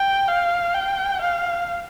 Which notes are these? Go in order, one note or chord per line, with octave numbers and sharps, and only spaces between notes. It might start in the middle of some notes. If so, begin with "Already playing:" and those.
Already playing: G5
F5
G5
F5